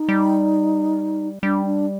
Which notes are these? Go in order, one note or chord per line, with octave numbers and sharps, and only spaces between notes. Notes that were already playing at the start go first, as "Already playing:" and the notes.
Already playing: D#4
G3
G3 D4
D4